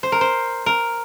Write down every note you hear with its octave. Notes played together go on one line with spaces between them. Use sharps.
C5
A#4
C5
A#4